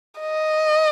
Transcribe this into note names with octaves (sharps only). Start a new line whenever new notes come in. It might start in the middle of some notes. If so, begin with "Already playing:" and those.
D#5